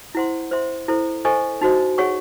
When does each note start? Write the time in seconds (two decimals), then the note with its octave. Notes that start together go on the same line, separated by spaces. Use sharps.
0.15 E4 C5 F#5 C6
0.51 C5 E5 C6
0.88 E4 A4 C5
1.25 A4 C5 D#5 G#5 C#6
1.61 D#4 F#4 C5 D#5
1.98 G#4 C#5 F#5 C#6